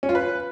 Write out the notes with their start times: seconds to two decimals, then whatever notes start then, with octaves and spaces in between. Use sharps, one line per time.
0.03 C#4
0.09 F4
0.15 B4